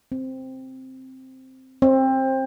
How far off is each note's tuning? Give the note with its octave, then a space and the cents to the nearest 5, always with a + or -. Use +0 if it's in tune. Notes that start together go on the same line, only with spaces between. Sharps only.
C4 +0
C4 +20